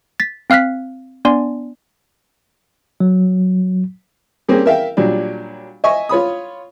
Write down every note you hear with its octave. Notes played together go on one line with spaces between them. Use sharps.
A6 B6
C4 F5 F6 F#6 B6
B3 D4 D5 G#5 C6
F#3
G3 A#3 C4 C#4 G4 G#4
A#4 E5 F5 G5
A#2 F#3 G3 D4
D#5 E5 G#5 C#6
F4 C#5 B5 D#6